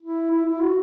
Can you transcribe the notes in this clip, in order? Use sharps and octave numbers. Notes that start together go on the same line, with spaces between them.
E4
E4
E4
F#4